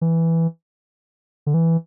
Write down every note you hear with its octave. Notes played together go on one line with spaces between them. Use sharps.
E3
D3
E3